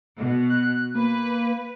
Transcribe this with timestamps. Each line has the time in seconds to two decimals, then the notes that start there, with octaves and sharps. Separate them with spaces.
0.17 B2
0.50 F#6
0.95 A#3 B4